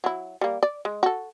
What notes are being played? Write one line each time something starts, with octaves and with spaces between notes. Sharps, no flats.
F#3 E4
G3 A#3
D5
G#3
F#4 A4